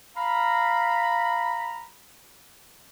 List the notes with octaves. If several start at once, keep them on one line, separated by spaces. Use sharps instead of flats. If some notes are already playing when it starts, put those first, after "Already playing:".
F5 A#5 B5